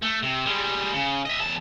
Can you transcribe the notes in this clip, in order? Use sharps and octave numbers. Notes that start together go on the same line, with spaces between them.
A3
C3
G3 G#3
C#3
D#5 E5
E2 A5